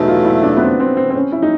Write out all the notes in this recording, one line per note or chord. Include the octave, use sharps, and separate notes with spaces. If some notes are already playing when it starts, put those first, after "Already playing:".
Already playing: E2 B2 F#3 A3 D#4
F4
E4
D4
B3
C4
C4
C4
C4
C#4
E4
D#4